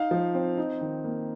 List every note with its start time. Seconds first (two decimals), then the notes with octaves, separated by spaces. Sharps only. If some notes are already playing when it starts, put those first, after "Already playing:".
Already playing: D#4 F5
0.11 F3
0.35 C4
0.57 D#4
0.81 D#3
1.04 A#3